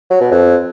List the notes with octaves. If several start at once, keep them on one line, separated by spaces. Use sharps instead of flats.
F#3
B2
F2